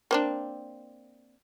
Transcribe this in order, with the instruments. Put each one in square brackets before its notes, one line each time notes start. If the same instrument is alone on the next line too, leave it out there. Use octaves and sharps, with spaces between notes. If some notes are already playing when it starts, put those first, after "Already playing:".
[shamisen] A#3 C4 D4